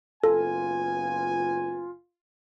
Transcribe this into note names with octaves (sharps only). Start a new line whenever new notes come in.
F#1 B3 F4 A4 G#5